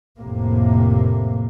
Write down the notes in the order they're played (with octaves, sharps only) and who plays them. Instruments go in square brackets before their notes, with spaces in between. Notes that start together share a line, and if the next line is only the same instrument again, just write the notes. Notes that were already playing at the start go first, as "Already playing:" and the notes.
[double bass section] F1 A2 C3 A#3